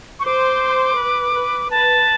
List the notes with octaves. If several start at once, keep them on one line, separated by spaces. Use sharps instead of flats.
C#6
C5 D6
B4
B4
B4 A5